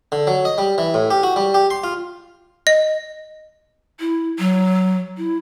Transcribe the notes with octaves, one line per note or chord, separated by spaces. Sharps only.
D3
F#3
D#5
G3
E3
A2
G4
F#4
G3
G4
C6
F4
D#5
E4
F#3
E4